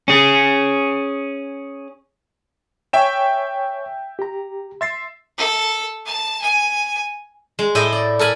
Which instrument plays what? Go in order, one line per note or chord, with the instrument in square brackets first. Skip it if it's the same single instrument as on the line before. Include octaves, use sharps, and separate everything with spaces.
[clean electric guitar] C#4 G#4
[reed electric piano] C#5 G#5 C#6 [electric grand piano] E5 G5 E7
[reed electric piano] G4 A#5
[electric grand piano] E5 A6 C7 [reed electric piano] C6
[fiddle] A4
A5
G#5
[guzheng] G#3
A2 E4 D#5 G5
D5
A4 A#4 G#5 B5